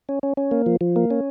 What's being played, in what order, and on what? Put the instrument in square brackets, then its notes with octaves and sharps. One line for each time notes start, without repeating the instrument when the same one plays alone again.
[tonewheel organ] C#4
C#4
C#4
A#3
F3
F3
A#3
C#4